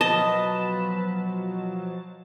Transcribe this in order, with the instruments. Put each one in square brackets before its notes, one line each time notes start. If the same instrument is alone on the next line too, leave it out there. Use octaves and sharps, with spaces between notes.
[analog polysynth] B2 F3 F#3 [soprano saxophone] B4 [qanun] D#5 [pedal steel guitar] A5